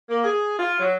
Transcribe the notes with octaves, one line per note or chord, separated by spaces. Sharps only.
A#3
G#4
F4
F#3